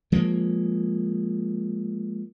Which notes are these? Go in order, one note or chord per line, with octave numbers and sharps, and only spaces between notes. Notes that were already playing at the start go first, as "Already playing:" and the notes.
F3 G#3 A#3